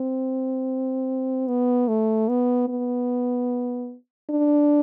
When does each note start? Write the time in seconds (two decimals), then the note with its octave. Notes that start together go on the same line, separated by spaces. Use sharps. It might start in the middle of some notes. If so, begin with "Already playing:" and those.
Already playing: C4
1.47 B3
1.88 A3
2.28 B3
2.68 B3
4.30 D4